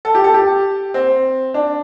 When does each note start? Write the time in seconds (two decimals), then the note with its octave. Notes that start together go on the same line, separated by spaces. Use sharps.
0.05 A4
0.15 G4
0.24 A4
0.34 G4
0.94 C4
1.54 D4